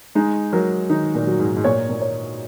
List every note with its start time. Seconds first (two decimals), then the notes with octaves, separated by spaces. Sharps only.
0.15 G#3 D#4
0.53 F#3 A#4
0.90 D#3 D#4
1.15 A#2
1.27 F#3
1.39 G#2
1.57 G#2
1.64 A#2 C#5
1.89 A#2
2.01 C#5